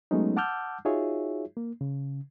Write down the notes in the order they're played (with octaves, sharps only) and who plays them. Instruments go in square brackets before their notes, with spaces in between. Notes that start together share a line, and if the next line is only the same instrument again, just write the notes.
[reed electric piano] F#3 G#3 A3 B3 C#4 D#4
F#5 A5 D6 E6 F6 G6
D#4 F4 F#4 G#4 C#5 E5
A#3
C#3